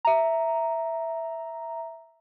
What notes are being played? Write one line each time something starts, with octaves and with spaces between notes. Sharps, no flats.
E5 A#5